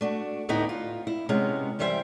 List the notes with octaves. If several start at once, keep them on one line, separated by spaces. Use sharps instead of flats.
A3 D4 F#4
D2 A2 B3 D#4 E4 G4
F4
E4
C3 G#3 B3 C#4
F#2 E3 G3 C5 E5 G5